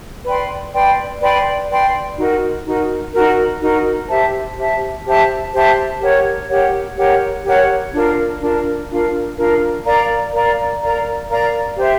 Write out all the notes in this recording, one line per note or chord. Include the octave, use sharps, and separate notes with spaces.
B4 D5 G5 C6
B4 D5 G5 C6
B4 D5 G5 C6
B4 D5 G5 C6
D#4 F#4 A#4
D#4 F#4 A#4
D#4 F#4 A#4
D#4 F#4 A#4
G4 C5 E5 A5
G4 C5 E5 A5
G4 C5 E5 A5
G4 C5 E5 A5
G4 A#4 C#5 F#5
G4 A#4 C#5 F#5
G4 A#4 C#5 F#5
G4 A#4 C#5 F#5
D4 F4 A#4
D4 F4 A#4
D4 F4 A#4
D4 F4 A#4
A#4 D5 F5 A#5
A#4 D5 F5 A#5
A#4 D5 F5 A#5
A#4 D5 F5 A#5
G4 C5 E5